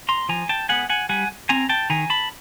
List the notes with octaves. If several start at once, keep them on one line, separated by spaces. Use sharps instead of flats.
A#5 C6
F3 G#5 A#5
G5 A5
G#3 B3 F#5 G#5
F#5 G#5
G3 F#5 G#5
C4 G#5 A#5
G5 A5
D#3 G#5 A#5
A5 B5